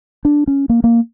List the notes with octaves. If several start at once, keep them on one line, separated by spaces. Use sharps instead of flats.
D4
C#4
A#3
A#3